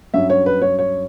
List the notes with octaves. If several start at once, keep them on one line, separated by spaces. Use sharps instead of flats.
G2 F#3 C#4 E5
C#5
B4
C#5
C#5